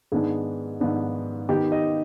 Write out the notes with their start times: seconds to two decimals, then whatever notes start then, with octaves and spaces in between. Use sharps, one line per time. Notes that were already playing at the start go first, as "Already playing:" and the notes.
0.12 G#2 D#3 B3 D4 G#4
0.80 G#2 D#3 B3 D4
1.49 D#3 B3 D#4 G4
1.72 D#5